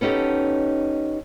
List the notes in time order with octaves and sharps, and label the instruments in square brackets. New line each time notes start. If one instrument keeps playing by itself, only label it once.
[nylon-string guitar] B3 C#4 D#4 G4 A4